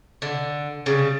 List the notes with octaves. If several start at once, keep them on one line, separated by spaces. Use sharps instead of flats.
D3
C#3 G3